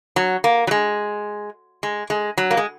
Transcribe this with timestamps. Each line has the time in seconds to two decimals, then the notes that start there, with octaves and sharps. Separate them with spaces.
0.16 F#3
0.44 A#3
0.67 F#3
0.71 G#3
1.83 G#3
2.10 G#3
2.38 F#3
2.51 A#3
2.57 G#3